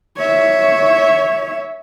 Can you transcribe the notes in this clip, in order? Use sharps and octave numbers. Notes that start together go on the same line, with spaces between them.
C#5 E5